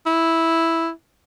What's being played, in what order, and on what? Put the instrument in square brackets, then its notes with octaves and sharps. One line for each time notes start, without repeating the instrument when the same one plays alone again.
[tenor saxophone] E4